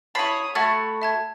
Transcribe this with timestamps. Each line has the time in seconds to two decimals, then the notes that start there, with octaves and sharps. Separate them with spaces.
0.15 E4 C#5 A5 B5 D#6 A6 C7
0.55 A3 F#4 E5 B5 G#6 A6
1.02 E5 A5 G#6